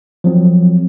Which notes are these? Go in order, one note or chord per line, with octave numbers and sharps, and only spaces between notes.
F3 F#3 C4